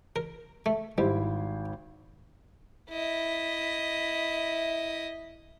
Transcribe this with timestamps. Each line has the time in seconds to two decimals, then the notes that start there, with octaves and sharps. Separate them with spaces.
0.16 A#4
0.66 A3
0.98 G#1 G3 E4 C5
2.90 E4 D#5